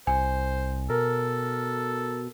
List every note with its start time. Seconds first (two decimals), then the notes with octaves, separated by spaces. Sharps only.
0.07 C2 C5 G#5
0.90 B2 A4 A#4